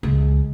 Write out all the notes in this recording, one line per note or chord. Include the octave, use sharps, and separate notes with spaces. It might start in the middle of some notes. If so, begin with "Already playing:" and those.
C#2